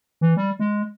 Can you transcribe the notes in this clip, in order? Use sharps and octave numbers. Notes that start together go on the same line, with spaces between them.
E3
G3
G#3